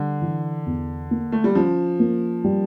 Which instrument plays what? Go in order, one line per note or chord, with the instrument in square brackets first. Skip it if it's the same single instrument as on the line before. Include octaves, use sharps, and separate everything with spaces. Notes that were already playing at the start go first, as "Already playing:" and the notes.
Already playing: [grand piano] D3 [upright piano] G3
[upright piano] E3
E2
A#3
[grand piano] A3
G3
[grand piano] F3 [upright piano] C#4
[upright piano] A#3
G3